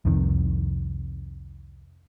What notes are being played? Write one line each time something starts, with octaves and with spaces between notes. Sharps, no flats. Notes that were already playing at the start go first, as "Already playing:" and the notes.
C2 F2 C3 D#3